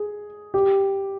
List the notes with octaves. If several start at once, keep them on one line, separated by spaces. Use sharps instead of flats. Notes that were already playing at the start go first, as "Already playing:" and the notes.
Already playing: G#4
G4